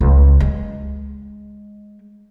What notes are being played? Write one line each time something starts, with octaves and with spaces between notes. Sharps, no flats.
C#2
G#3